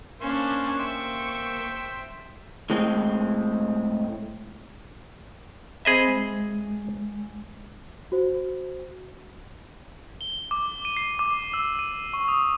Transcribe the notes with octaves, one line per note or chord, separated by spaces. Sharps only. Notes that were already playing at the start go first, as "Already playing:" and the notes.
A#3 C#4 D4 C5 F5 C#6
C5 E5 G5 C#6
A2 G#3 C4
C4 G#4 C5 D#5 E5 B5
G#3
F#4 C5
G7
D6
D#7
C7
D6
E6
D#7
C#6
D#6